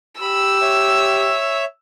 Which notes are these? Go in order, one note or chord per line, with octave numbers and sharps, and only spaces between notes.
G4 B5 E6
C#5 E5